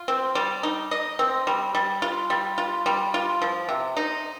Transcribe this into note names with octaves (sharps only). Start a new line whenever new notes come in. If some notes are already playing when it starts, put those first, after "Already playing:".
Already playing: F4
C4
G3
D#4
D#5
C4
G3
G3
F4
G3
F4
G3
F4
F3
C3
D#4